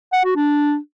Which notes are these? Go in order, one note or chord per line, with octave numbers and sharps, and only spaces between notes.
F#5
F#4
D4